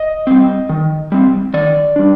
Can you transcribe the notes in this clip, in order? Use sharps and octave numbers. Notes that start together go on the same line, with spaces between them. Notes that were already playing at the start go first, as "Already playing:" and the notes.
Already playing: D#5
G3 C4
D#3
G3 C4
D#3 D5
G3 D4